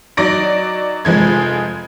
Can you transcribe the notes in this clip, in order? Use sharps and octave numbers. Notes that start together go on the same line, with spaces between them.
F#3 D#4 D5 A#6 D7
F1 F3 G#3 G#6